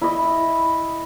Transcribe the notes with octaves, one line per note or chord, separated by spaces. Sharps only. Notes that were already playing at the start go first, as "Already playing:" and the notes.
E4 D#5